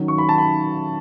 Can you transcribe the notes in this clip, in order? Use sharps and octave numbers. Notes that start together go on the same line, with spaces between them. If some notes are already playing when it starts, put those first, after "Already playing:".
Already playing: D#3 F#3 C#4
C#6
B5
A5
B5